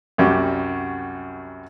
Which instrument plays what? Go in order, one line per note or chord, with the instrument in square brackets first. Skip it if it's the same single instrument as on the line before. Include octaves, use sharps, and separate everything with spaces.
[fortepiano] C2 F#2 G3 F#4 G4